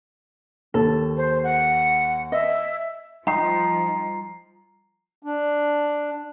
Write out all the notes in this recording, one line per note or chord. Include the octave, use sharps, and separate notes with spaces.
D#2 A4
C5
F#5
D#5 E5
F3 G3 D#4 A#5 C7
D4